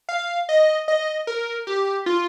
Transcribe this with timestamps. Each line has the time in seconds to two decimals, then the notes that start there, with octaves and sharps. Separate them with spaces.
0.09 F5
0.49 D#5
0.88 D#5
1.27 A#4
1.67 G4
2.06 F4